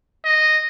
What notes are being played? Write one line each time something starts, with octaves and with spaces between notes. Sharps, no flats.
D#5